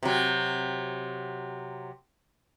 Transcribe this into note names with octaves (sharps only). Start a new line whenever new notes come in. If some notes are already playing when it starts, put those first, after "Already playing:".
C3 F#3